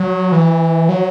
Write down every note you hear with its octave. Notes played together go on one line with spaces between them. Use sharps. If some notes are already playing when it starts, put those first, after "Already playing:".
Already playing: F#3
E3
F#3